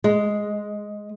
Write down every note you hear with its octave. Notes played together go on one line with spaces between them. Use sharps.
G#3